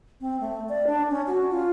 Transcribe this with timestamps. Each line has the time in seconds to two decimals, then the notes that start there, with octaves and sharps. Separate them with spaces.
0.21 C4
0.40 A3
0.69 D5
0.87 D4
1.10 C#4
1.27 F#4
1.50 F4